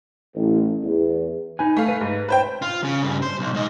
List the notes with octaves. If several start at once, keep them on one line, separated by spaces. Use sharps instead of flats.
A1
E2
D#4 B4 G#5
A3 F5
B4
G#2
B4 C5 G5
F4
C#3
G2 C#3
C5
B1
G#2 D#5